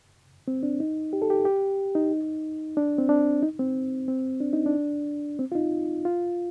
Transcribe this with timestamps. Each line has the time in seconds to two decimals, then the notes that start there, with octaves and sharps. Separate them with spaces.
0.48 C4
0.63 D4
0.80 D#4
1.13 G4
1.22 A4
1.30 G4
1.45 G4
1.95 D#4
2.77 D4
2.98 C4
3.09 D4
3.43 D#4
3.59 C4
4.08 C4
4.40 D4
4.53 D#4
4.66 D4
5.39 C4
5.52 F4
5.55 D#4
6.05 F4